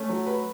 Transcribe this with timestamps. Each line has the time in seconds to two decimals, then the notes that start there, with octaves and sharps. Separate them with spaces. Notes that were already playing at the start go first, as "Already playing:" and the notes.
Already playing: A3 C#4
0.09 F#3
0.27 B4